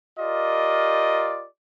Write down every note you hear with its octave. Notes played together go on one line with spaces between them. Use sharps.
F4 G4 A#4 D5 D#5